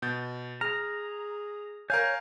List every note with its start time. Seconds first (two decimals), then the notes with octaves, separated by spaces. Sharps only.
0.02 B2 G6 A6
0.61 G#4 A#5 F6
1.90 A#4 C#5 F5 G#5 G6